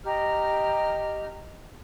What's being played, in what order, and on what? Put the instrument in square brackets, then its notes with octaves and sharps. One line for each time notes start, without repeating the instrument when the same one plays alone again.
[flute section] G4 D#5 A#5 F6